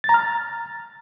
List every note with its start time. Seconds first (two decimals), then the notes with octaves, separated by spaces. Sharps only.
0.04 A6
0.09 A#5
0.14 F6
0.19 A6